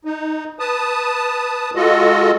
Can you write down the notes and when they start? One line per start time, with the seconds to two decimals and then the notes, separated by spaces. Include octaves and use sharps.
0.05 D#4
0.60 B4 A5 D#6
1.75 G#3 F4 F#4 A4 D#5